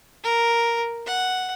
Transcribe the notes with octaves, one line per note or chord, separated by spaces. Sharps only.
A#4
F#5